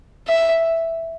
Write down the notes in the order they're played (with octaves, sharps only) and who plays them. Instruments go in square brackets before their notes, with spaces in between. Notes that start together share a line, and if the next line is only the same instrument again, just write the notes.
[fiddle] E5